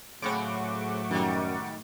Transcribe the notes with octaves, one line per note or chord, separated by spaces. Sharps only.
A2 C#3 F#3 A3 C4 F#5 C#6 D6
F#2 D#3 G3